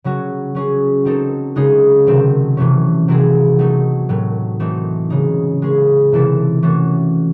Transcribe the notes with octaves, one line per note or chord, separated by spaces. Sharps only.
C#3 F#3 C#4 F#4
F#3 C#4 G#4
F#3 C4 D#4 A4
C#3 G#3 D#4 G#4
C3 D#3 F#3 A3 C4
C3 E3 A3 C#4
C3 F#3 C4 E4 G#4
F#3 A3 D#4
A2 F#3 A3
E3 A3 C4 D#4
C#3 G#3 D#4
G#3 C#4 G#4
C3 E3 C4 E4 A4
E3 A3 C#4 F#4 A4